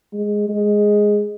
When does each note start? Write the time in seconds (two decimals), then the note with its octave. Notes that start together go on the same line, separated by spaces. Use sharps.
0.13 G#3
0.49 G#3